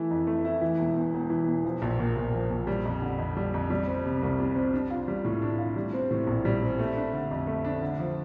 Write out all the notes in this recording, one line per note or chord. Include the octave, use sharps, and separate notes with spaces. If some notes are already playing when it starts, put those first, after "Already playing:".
Already playing: E3 A3 E4
F2
A3
E4
E3
E1
E2
E1
E3
E1
F3
A#1
A#2
A#1
F3
A#1
G3
F2
D3
F2
G3
F2
G3
C4
C3
C2
G3
C4
D4
F4
G3
A2
D4
F4
G3
C4
A2
A#1
G3
C4
A3
D4
D3
F2
A3
D4
D3
F3